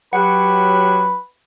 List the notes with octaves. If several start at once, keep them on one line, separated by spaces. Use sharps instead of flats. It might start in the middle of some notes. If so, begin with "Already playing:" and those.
F#3 G4 B4 F#5